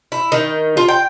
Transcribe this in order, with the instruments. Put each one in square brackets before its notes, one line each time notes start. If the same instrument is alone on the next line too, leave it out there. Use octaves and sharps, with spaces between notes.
[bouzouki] E4
D#3
F4
G5